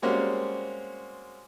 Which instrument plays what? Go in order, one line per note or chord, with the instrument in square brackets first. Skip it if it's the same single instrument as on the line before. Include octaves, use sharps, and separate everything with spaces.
[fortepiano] G3 G#3 A#3 C4 C#4 F#4